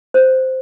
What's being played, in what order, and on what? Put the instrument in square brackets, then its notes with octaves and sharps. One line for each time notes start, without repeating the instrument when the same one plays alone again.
[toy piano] C5